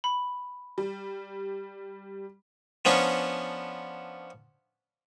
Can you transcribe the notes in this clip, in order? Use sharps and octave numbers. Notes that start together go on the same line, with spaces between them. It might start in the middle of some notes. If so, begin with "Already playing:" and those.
B5
G3
F3 B3 C#4 D4